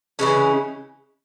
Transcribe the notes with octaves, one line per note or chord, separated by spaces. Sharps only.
C#3 E3 G#3 C#4